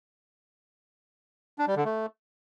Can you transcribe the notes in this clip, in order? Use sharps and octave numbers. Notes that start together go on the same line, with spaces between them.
D4
G3
D3
A3